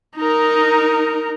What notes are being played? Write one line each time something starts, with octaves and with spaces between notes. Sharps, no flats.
D#4 A#4